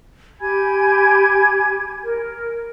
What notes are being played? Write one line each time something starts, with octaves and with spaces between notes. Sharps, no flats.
G4 G#5 B5 G#6
A#4